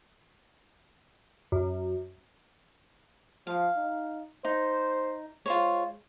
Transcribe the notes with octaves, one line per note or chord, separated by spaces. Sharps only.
F#2
F3 F5
D#4
D#4 C5
G#3 F4 C5 C#5